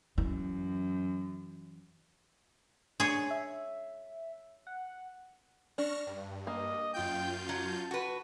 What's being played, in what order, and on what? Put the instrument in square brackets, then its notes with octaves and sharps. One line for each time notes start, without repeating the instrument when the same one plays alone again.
[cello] F#2 [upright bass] E3
[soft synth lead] D4 [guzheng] G#4 C#5
[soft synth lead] E5
F#5
[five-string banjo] D4 [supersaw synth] C#6 F6 A#6
[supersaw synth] G2
[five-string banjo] A#3 [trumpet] D#5
[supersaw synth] F#2 F4 G6 [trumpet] G5
[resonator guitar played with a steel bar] F#3 [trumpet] A5
[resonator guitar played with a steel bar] F#4 B4